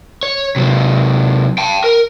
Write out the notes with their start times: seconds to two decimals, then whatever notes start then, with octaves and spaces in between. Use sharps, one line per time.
0.23 C#5
0.56 C3 F#3
1.58 G5 A5
1.84 A#4